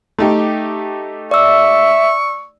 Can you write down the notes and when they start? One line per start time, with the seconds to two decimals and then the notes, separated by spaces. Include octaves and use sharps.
0.18 A3 D#4 G4
1.31 D5 E5 C#6 E6